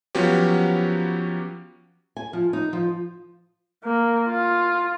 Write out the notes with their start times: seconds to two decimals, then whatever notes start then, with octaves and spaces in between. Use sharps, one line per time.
0.15 F3 F#3 B3 C#4 F#4 G4
2.17 G#5
2.33 F3
2.53 D#4
2.73 F3
3.84 A#3
4.29 F4